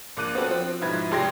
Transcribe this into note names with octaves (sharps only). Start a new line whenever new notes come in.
A#1 A#3 D6 F#6 D#7
B3 C4 F#4 A4
F3 C4
G#2 B2 F3 E4 B4 G#6
F1 G#3 G4 C6 G#6 A#6